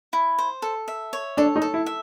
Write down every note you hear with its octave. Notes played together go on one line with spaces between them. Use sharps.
E4
C5
A4
E5
C#5
D4 A4
D#4
A4
E4
E5